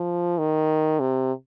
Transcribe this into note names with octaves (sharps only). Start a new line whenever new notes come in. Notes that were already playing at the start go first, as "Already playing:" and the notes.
Already playing: F3
D#3
C3